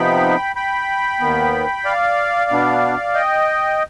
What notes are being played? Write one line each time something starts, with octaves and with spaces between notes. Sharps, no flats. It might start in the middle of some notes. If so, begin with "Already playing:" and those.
Already playing: C3 F3 B3 D#4 G5 B5
G5 B5
D#2 D#3 B3
D5 F5
B2 B3 D4
D#5 G5